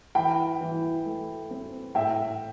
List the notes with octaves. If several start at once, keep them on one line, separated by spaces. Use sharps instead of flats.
E3 G5 B5
E3
A3
C4
A2 E5 G5